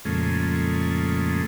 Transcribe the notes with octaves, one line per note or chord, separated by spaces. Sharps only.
F2 A#2 C#3 G#3 A3